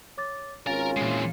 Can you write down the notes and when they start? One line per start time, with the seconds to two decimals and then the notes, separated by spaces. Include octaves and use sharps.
0.17 C#5 D6 A6
0.67 G#1 C#4 F4 A#4 F5 G#5 A#5 A6
0.97 A#2 E3 G#3 C7